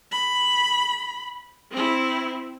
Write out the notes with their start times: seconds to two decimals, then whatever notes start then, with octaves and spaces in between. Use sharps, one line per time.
0.12 B5
1.72 C4 E4